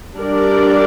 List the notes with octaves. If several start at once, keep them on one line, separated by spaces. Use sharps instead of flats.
G3 D4 G4 A#4 D5